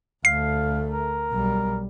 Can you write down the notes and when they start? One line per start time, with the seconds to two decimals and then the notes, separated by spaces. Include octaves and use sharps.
0.25 D2 A3 F5 C7
0.91 A#4
1.32 B1 G3